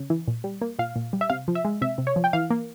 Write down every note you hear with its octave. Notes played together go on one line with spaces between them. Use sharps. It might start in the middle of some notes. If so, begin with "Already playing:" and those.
Already playing: C#3
E3
A#2
G3
A#3
A#2 F5
A#2
G3
E5
C3 F5
F3
E5
G#3
C3 E5
C3
C#5
F3
G5
E3 F5
A#3